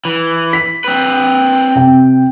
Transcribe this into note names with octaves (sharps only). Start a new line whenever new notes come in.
E3
B6
C4 B4
C3 G5